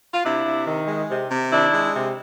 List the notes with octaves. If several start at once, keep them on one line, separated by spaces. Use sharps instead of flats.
F4
C3 D4 E4
C3
D#3
G#3
C3
C3
D#3 D4 E4
G#3
C3